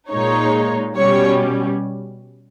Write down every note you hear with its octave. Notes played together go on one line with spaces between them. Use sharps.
A#2 G#3 D#4 C#5
B2 G3 C#4 C#5